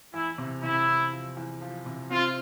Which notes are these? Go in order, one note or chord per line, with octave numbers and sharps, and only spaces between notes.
E2 E4
C3
C3 E4
E2
F3
E2
F3
C3
C4 F4